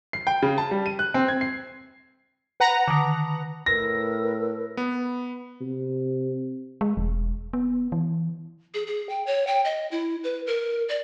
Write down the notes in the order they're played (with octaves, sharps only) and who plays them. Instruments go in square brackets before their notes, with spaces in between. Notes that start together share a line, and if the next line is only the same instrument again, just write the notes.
[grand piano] C7
G5
C#3
A5
G3
D#7
F#6
C4
G#6
C7
[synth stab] B4 F#5 A#5
[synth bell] D3 D#3
[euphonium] A2 [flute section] A#4 B4 E6 [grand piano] A#6
[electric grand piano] B3 [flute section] B5
[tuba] C3
[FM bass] G#3
E1
B3
E3
[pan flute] G#4
G#4
G5
C#5
G5
D#5
E4
B4
A#4
D5